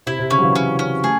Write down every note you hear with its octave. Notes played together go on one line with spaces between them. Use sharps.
C3 E4
C3
C#3 C#4
F#3
C#3 E3
C#4
C#4
A3 G#4